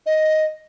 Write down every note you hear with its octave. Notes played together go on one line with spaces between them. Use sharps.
D#5